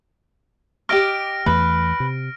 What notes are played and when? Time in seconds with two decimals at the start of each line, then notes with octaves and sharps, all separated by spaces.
0.89 G4 D#5 D6 F6 A#6 D7
1.46 E2 E3 A3 B4
2.00 C3